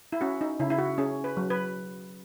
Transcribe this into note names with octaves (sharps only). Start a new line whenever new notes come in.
E4
C#4 F#4
D#4
C#3 E4
E4
F#4
C#4 G#4
B4
F#3
B4